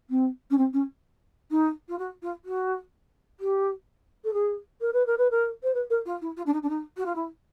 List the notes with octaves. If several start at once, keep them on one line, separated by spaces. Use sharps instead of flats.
C4
C#4
C4
C#4
D#4
F4
F#4
F4
F#4
G4
A4
G#4
A#4
B4
A#4
B4
A#4
C5
B4
A#4
F4
E4
F4
D4
D#4
D4
D#4
F#4
F4
E4